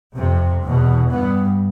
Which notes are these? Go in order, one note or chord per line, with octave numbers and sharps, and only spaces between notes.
F2 C3
E2 B2
G2 B3